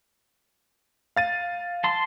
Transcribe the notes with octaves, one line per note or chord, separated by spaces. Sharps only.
F5 A6 D#7
A5 C6